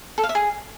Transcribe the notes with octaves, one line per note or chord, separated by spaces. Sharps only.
A4
F5
E5
G#4